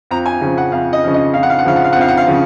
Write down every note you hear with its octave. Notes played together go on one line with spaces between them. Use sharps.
F2 A#5
G#5
C#3 F3
F#5
F2 F5
D#5
C#3 F3
D#5
F2 F5
F#5
F5
F#5
C#3 F3 F5
F#5
F5
F2 F#5
F5
F#5
F5
C#3 F3